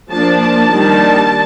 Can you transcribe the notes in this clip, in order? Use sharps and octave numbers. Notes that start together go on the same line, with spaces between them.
F3 A#3 D4 A5
A5
D#3 G3 D4